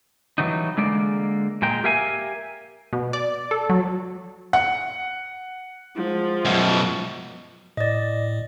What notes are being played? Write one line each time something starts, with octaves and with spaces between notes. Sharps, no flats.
E3 F#3 G3 D#4
D3 G#3 A#3 D5
A#2 G#3 G5 A#5
G4 A#4 E5 F5 G#5
B2
D5
A4
F#3
F#5
F3 G#3
F#2 B2
A2 D5 D#5